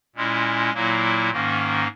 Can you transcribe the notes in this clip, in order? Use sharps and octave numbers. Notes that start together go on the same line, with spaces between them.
A#2 G#3 C#4 E4
A#2 F#3 A#3 E4
G#2 D#3 A#3 C#4